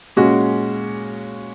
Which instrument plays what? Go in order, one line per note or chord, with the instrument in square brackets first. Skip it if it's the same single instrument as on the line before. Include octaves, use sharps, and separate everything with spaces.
[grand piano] A#2 G#3 C#4 F#4